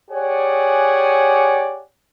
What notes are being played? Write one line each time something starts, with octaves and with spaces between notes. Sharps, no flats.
G4 G#4 C#5 D5 F#5 G#5